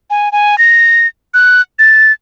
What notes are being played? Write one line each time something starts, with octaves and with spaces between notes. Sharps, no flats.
G#5
G#5
A#6
F#6
A6